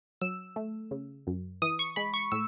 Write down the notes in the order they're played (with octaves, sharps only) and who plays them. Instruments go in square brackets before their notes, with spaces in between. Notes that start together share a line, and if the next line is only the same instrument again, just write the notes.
[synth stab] F#3 E6
A3
C#3
F#2
E3 D#6
C#6
G#3 B5
C#6
A2 E6